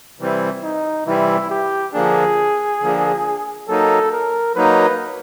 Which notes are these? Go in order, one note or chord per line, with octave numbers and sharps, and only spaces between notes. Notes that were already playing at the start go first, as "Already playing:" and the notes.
C3 E3 G3 C4
D#4
C3 E3 G3 C4 E4
G4
D3 F3 A#3 D4 G#4
D3 F3 A#3 D4
F#3 A#3 D#4 A4
A#4
F#3 A#3 D#4 B4